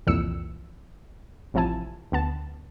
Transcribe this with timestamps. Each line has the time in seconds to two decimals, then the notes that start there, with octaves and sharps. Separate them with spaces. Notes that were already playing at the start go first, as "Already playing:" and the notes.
0.07 C2 F2 A#2 E3 E6 C#7
1.54 A1 C3 F3 E4 G#5 A5
2.12 D2 B3 A5